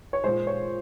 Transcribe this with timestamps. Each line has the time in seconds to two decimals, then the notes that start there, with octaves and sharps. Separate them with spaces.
0.13 C#5
0.24 A#2 G#3 C5
0.47 C#5